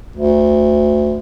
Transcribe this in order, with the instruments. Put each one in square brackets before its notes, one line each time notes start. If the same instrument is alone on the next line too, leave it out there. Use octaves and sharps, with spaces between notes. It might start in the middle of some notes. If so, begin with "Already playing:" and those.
[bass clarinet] D2